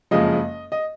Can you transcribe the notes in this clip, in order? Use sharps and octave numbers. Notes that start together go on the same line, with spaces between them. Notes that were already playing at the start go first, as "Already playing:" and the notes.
F#1 F2 C#3 F3 G#3 D#5
D#5